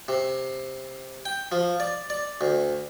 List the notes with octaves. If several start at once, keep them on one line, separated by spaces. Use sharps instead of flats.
C3
G5
F3
D5
D5
D2